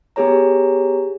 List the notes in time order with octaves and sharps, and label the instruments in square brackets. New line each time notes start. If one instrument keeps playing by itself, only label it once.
[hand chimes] B3 G4 G#4 C#5 A#5